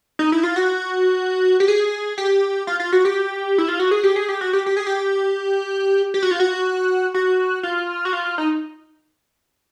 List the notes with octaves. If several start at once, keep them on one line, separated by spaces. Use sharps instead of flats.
D#4
E4
F4
F#4
G4
G#4
G4
F4
F4
F#4
G4
E4
F4
F#4
G#4
G4
G#4
G4
F#4
G4
G4
G#4
G4
G4
F#4
F4
F#4
F#4
F4
F#4
F4
D#4